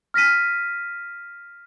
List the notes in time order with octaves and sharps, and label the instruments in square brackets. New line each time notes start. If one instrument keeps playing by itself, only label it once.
[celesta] F6 A#6 B6 D#7